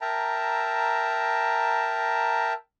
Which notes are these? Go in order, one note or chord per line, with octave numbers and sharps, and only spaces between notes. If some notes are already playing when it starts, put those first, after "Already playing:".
A#4 E5 G5 A5 A#5